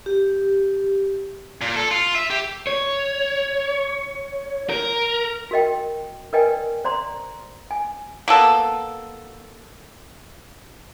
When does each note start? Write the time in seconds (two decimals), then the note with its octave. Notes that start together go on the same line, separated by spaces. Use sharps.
0.06 G4
1.61 A#2
1.76 A4
1.91 F4
2.15 E5
2.30 G4
2.67 C#5
4.70 A#4
5.51 F#4 A#4 D#5 G5
6.33 A#4 B4 D5 D#5 G5 G#5
6.84 C5 D5 A#5 C6
7.71 G#5
8.28 A#3 B3 A4